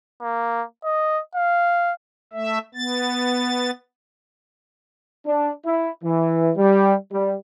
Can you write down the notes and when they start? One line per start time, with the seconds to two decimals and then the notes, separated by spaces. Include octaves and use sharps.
0.22 A#3
0.84 D#5
1.35 F5
2.33 A3 E5
2.74 B3 A6
5.27 D4
5.65 E4
6.04 E3
6.57 G3
7.12 G3